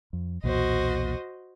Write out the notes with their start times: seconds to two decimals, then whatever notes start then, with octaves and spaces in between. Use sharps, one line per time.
0.13 F2
0.44 B1 E2 A#2 F#4 C5 D#5